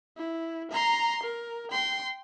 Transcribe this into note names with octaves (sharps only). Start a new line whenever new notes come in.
E4
A#5 C6
A#4
G5 C6